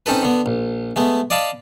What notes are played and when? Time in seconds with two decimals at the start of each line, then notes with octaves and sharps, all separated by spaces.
0.06 C4 C#4 D#4 A4 B4
0.22 D3 B3
0.46 A#1
0.96 G#3 A3 B3
1.30 D5 D#5 F5 A5 B5